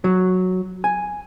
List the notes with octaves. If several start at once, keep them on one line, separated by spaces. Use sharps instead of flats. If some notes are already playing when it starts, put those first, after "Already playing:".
F#3
G#5